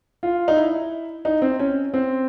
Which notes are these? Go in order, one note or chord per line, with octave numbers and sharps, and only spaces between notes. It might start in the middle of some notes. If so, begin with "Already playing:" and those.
F4
D#4
E4
D#4
C4
C#4
C4